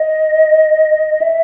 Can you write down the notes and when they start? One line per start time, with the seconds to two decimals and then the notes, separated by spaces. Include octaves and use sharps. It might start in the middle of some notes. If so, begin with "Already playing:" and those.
Already playing: D#5
1.22 E5